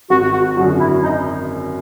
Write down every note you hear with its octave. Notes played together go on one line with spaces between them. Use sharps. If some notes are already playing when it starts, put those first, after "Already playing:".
G#1 F#4
F#4
F#2 D3 F#3 F#4
E4
D#4